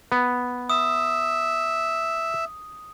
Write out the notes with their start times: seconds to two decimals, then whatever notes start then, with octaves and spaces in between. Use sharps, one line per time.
0.12 B3
0.70 E5 D#6